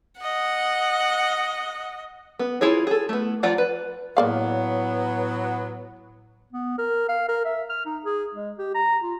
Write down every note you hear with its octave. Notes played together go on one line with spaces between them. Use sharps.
D#5 F#5
B3
E4 F4 G#4 C#5
G#4 A4
A3 B3
F3 F4 D5 F#5 A#5
B4
A2 F#3 A#3 B3 D5 F5
B3
A#4
F5
A#4
E5
F6
D#4
G#4
G#3
G4
A#5
F4